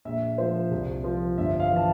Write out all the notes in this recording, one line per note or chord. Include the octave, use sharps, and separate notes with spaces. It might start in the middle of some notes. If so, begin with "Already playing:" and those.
A#1 E5
F3 C5
C2
F3
G1 E5
F5
E3
A5